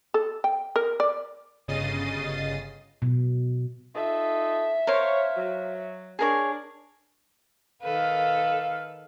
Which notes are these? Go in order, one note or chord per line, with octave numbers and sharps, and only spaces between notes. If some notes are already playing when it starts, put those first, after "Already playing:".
A4
G5
A#4
D5
G1 C#3 D#5 A6 C7 D#7
B2
D#4 F4 A4 E5
A#4 C5 C#5 F5
F#3
D4 G#4 A#4 C#5
D#3 A4 B4 F5